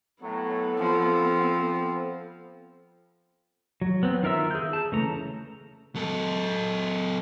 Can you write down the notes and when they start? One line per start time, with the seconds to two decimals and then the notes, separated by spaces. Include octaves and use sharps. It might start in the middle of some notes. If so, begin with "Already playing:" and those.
0.22 A2 F#3 B3 A4
0.78 F3 C4
3.82 F#3
4.03 B3 C4
4.23 D#3 F4 A#4 E5 E6
4.51 G#4 G6
4.73 A5
4.92 C#3 E3 A3 A#5
5.95 F#3 A4